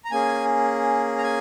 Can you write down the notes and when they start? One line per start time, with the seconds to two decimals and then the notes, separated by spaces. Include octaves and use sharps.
0.05 A#5
0.11 A#3 C#4 G#4 G#5
1.18 A#5
1.23 G#5